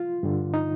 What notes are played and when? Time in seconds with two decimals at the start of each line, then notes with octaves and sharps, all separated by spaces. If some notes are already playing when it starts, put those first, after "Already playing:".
Already playing: F4
0.23 G2 D3
0.54 D#4